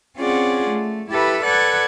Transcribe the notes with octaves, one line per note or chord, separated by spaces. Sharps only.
C4 C#4 F4 G#4 D5 F#5
A3
E4 G4 A4 B4 E5 B5
A4 B4 D5 F#5 F#6 G#6